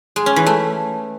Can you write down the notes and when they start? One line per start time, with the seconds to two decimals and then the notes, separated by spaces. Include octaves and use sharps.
0.16 G#3
0.26 C#4
0.36 E3
0.46 A3